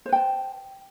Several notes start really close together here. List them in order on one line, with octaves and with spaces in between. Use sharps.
C5 B4 G5 A5